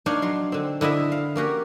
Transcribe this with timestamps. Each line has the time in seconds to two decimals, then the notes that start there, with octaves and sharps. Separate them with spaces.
0.06 D4 D#4 C#5 F5 G#5
0.22 F#3 C6
0.52 D3 C4
0.81 D3 E4 D#5 E5
1.12 F5
1.36 A#3 C#4 F#4 G4